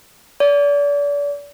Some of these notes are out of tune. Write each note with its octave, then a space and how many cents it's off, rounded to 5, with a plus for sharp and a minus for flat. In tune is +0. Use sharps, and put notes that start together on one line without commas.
D5 -35